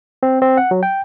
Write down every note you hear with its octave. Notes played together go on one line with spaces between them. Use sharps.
C4
C4
F#5
F#3
G5